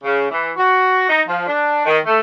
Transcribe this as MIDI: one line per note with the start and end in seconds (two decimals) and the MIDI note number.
0.04 0.28 49
0.30 0.51 52
0.56 1.05 66
1.08 1.20 63
1.27 1.44 53
1.46 1.82 62
1.86 1.98 51
2.05 2.20 57